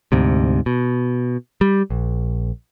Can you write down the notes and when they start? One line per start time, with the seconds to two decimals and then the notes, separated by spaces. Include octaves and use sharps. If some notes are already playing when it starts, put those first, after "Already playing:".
0.12 D2 G#2 C3
0.66 B2
1.61 G3
1.90 A#1